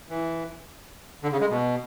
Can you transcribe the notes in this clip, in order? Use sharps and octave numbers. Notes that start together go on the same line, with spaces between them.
E3
D3
C#3
G#3
B2